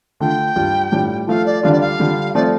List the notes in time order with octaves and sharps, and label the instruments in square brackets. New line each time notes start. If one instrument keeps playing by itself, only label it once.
[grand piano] D3 A3 F4 [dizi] G5
[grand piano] G2 G3 F4
A2 G3 D4 F4
[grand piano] F3 A3 F4 [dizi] F5
[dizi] D5
[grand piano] D3 G3 D4 F4 [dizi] F5
[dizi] D5
F5
[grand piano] D3 G3 F4
[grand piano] F3 A3 C4 F4 [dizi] D5